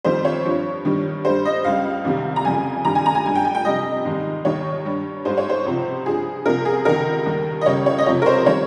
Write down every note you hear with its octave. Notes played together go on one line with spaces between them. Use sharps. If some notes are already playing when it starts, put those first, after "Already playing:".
F2 D#3 G3 C5
C#5
G2 F3
G2 D#3 G3
G2 G3 C5
D#5
C#2 C#3 G3 F5
C2 C3 D#3 G3
A#5
F2 C#3 G3 G#5
G2 D#3 G3 A#5
G#5
A#5
G#5
G2 G3 G#5
G5
G#5
G5
F2 C3 G3 D#5
G#2 D#3 G3
D#2 D#3 G3 C#5
G2 G3
G#2 G3 C5
C#5
C5
C#2 C3 F3
G2 F3 G#4
C2 C3 F3 A#4
G#4
C#2 C3 D#3 A#4
D#2 D#3 G3
D#5
C#2 C#3 G3 C#5
C#5
D#5
F2 C3 F3 C#5
A#4
C5
D#3 G3 C#5